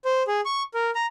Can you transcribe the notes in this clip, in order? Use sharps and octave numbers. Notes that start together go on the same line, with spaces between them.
C5
G#4
C#6
A#4
A#5